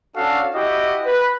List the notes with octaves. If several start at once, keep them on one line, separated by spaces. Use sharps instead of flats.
C#4 D4 F#4 A4 F5
E4 F#4 G4 D#5
B4